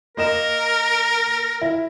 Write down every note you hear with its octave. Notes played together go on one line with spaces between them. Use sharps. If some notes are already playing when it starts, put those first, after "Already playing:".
A#3 A#4 D#5 E7
E4